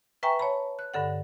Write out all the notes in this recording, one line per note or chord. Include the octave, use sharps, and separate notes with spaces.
B4 E5 G5 G#5 A#5 C#6
C#5 A5 B5
F#6
G2 D3 A4 F#5